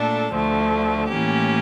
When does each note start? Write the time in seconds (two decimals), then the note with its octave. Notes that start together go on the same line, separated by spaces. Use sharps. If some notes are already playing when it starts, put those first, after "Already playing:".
Already playing: A#2 A3 D4 A4
0.32 D2 D3 F3 A3
1.09 A2 E3 A#3 C#4 G4